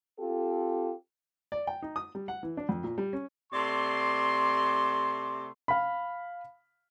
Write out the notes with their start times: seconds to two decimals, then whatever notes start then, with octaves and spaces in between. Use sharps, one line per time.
0.20 C4 F4 G4 A4
1.52 D5
1.67 G5
1.82 D#4
1.96 D#6
2.15 G3
2.28 F#5
2.43 E3
2.57 D4
2.69 F2
2.84 A#2
2.98 G3
3.13 C#4
3.53 C3 A3 D5 C6
5.68 F5 B5